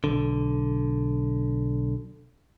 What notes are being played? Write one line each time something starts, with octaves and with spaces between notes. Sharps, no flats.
B1 D3